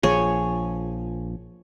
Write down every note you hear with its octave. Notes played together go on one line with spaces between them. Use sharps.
A#1 F3 G#4 C#5